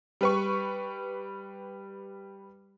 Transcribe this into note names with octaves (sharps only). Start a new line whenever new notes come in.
G3 B4 C#6